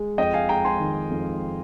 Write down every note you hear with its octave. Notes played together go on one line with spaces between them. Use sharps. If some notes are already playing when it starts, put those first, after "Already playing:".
Already playing: G#3
F2 D#5 G5
F5 G#5
G#3 G5 A#5
G#5 C6
D#3
F2